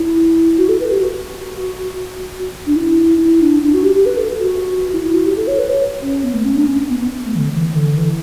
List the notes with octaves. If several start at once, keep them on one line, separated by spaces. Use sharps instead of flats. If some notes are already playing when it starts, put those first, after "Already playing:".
Already playing: E4
F#4
A4
B4
G4
F#4
D4
E4
E4
D4
D4
F#4
G4
G4
B4
A4
F#4
E4
E4
F#4
G4
A4
C#5
B4
C#5
C#4
B3
A3
C#4
D4
C#4
B3
B3
A3
E3
D3
E3
D3
E3